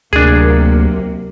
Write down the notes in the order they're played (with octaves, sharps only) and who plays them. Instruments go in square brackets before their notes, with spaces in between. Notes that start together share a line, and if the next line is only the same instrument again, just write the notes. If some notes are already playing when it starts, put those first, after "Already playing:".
[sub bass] D2 [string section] C3 F#3 A#3 [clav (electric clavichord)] D4 G#4